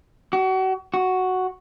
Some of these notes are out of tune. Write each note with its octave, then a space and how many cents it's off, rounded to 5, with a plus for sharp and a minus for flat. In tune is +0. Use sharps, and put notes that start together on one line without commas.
F#4 +35
F#4 +0